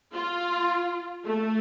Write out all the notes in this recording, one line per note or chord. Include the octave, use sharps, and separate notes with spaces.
F4
A3